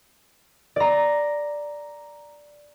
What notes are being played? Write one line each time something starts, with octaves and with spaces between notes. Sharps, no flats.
D5 A#5